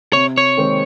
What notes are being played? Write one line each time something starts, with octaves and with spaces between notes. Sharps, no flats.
C3 C#5
C#5
D#3 G#3 C4